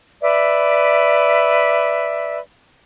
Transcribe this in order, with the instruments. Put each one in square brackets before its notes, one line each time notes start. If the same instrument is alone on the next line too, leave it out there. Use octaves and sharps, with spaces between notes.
[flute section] B4 D5 E5